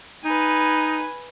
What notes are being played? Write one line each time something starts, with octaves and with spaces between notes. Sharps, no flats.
D#4 B4 G#5